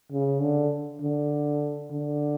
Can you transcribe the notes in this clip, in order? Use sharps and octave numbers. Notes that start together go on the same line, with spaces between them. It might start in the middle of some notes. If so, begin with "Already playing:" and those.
C#3
D3
D3
D3